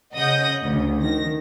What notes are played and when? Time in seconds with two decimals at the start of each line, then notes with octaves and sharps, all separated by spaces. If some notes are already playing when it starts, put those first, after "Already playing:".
0.14 C#3 D#5 F#5 D#6 G6 A#6
0.64 D2 C#3
0.98 D#3 A#6